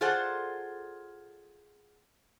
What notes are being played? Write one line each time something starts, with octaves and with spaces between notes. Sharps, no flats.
F4 G#4 A4 C5 D5 F#5